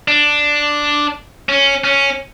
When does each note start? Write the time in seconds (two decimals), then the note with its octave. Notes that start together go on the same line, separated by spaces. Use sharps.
0.08 D4
1.49 C#4
1.84 C#4